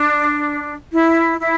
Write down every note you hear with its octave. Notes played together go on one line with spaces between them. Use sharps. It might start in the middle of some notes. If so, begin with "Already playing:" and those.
Already playing: D4
E4
E4